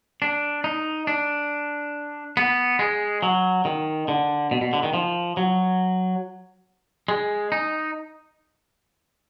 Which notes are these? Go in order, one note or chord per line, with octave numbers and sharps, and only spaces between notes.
D4
D#4
D4
B3
G#3
F#3
D#3
D3
B2
B2
D3
D#3
F3
F#3
G#3
D#4